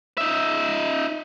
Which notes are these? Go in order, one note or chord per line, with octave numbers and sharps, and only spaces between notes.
D#4 E5